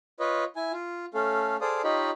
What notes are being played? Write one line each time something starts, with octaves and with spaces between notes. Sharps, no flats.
F4 B4 C#5 D#5
E4 G#5
F4
A3 C#4 A4 F5
G#4 A4 C5 D5 F5 D#6
D#4 F4 G4 C#5 D#5 B5